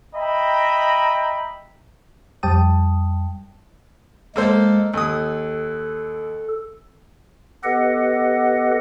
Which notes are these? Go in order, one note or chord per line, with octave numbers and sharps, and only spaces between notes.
D#5 E5 G5 A#5 B5
F2 G3 G5 A5 D#6
G#3 A#3 A4 C5
D#2 A4 D#6
B3 G4 A4 B4 D#5 F#5